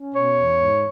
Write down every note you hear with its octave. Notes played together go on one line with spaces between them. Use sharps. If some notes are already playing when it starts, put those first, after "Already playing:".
Already playing: C#4
B2 C#5
E2
G#2